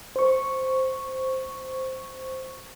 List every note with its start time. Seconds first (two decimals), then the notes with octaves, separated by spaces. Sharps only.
0.16 C5 C#6